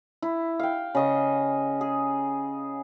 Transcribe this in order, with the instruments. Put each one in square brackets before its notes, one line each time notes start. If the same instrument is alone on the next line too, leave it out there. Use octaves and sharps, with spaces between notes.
[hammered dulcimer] E4
F5 G5
C#3 D#5 C#6
G#4